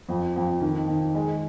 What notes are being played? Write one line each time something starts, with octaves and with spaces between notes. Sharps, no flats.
F2
F2
D#3
D#3
G#3